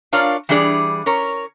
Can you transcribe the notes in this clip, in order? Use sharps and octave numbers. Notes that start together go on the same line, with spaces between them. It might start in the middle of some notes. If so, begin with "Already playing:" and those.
D4 F4 A#4 C#5 D5 F5
E3 G3 D4 G#4 D5
C#4 A#4 C#5